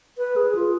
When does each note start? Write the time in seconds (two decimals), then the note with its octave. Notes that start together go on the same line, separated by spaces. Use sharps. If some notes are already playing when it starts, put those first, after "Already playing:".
0.18 B4
0.36 G#4
0.55 F4